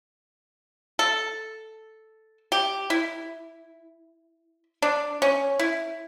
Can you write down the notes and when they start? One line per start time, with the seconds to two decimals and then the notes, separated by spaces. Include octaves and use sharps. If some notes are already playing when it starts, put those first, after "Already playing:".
0.99 A4
2.52 G4
2.90 E4
4.82 D4
5.22 C#4
5.59 E4